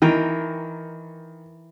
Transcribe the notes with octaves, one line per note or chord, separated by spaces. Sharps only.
D#3 E3 A#4 G5